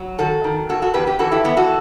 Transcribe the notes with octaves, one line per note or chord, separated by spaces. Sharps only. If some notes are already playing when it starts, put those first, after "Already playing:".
Already playing: F#3
D#3 F#4 A4
D#3
E2 F#4 A4
F#4 A4
E2 G4 B4
G4 B4
E3 F#4 A4
E4 G4
E3 B3
F#4 A4